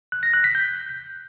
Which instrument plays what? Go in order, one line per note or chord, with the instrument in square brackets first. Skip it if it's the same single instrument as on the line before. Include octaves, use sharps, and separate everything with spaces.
[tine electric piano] F#6
A#6
F#6
B6
G6